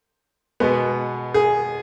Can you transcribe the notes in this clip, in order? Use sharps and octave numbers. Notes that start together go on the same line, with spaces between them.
B2 G#3 B3
G#4